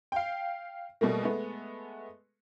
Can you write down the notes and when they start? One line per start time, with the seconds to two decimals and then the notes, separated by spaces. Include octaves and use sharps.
0.12 F5 G5
1.01 B2 G3 A3 A#3
1.22 G#3 A3 B3